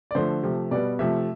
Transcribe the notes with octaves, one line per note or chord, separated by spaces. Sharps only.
D5
D3 F3 A3 C5
C3 F3 A3
B2 G3 B3 D5
C3 F3 A3 E5